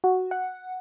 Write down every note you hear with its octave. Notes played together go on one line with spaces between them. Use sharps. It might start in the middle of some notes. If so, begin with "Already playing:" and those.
F#4
F#5